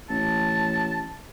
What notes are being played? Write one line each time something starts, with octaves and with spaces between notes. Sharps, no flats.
A1 A5